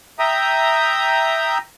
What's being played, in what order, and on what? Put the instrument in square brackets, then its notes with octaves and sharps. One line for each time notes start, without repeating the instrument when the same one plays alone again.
[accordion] E5 G5 A#5 D#6